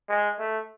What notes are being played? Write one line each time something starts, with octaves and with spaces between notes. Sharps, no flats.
G#3
A3